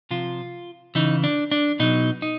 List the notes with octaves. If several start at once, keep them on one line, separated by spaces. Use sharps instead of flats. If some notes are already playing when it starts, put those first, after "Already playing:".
C3 F3 F4
C#3 E3 D#4
D4
D4
B2 F#3 D#4
D#4